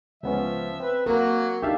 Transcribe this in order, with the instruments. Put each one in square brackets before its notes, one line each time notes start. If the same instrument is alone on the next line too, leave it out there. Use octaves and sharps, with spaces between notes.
[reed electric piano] C#2 B3 C#4 [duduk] F3 [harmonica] E5
[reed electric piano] C4 [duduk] B4
[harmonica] F#3 F#4 [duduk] A#3 [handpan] A#4
[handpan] D4 D#4 [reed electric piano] G4 E5 F5 [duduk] A4